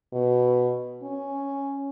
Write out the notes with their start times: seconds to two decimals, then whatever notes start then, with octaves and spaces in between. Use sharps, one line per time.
0.13 B2
1.03 C#4